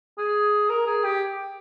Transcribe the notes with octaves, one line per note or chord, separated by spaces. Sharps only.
G#4
A#4
G#4
G4